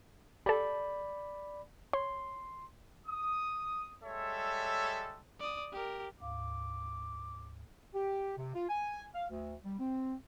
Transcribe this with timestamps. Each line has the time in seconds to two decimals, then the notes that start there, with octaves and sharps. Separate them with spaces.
0.46 G4 A4 D5 B5
1.93 C#5 C6
3.07 D#6
4.04 G3 G#3 A4 C#5 E5
5.40 D5 D#6
5.72 G4 A#4
6.20 D2 G#2 F5 D6
7.95 G4
8.37 C3
8.55 F4
8.69 G#5
9.15 F5
9.30 D2
9.64 G3
9.79 C4